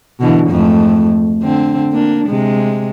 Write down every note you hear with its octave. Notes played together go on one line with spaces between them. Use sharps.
B2 D3 E3
F2 G#2 A3
D3 C4
A#3 D4
C3 G#3